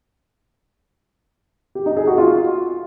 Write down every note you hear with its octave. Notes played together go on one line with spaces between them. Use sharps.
G4
D#4
G#4
F#4
F4